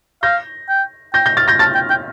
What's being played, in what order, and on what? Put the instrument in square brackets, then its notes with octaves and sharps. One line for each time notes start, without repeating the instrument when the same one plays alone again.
[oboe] F5 [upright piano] G6 A#6
[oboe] G5
[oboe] G5 [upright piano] G6 A#6
[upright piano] G6 A#6
F6 A6
G6 A#6
[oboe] A5 [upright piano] F6 A6
[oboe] G5
G5